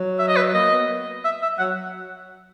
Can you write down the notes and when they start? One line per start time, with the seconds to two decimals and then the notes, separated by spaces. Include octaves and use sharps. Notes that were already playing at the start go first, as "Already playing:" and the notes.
Already playing: F#3
0.19 E5
0.28 D#5
0.36 B4
0.54 A#3 D#5
0.71 B3
1.24 E5
1.42 E5
1.58 F#3 F#5